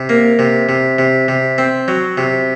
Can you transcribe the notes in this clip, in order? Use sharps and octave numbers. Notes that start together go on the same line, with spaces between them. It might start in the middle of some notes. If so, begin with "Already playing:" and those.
Already playing: C3
A#3
C3
C3
C3
C3
C4
F#3
C3